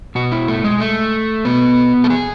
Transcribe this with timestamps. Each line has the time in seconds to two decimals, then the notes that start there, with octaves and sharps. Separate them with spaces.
0.15 B2 F#4
0.32 E4
0.48 A3
0.64 G#3
0.80 A3
1.45 B2 B3
2.04 A4
2.10 G#4